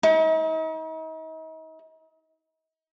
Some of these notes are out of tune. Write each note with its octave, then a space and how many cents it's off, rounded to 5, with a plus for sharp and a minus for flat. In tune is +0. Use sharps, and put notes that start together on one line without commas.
D#4 +40